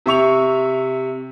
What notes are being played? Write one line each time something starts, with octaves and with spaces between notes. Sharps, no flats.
C3 E5 C#6 F7